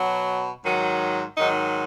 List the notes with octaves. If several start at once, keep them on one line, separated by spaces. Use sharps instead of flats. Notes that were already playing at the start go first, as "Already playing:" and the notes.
Already playing: B2 F#3
G#2 D#3 F#3
G#2 D#3 F#3 D#4